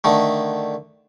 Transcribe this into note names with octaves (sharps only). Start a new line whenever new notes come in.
D3 D#3 A3